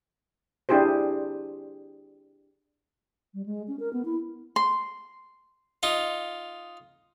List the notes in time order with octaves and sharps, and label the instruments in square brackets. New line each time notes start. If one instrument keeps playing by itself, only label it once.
[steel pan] D4 E4 G4 G#4 C5
[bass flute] G3
G#3
C#4
A#4
B3
E4
[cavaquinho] C6
[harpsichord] D#4 F4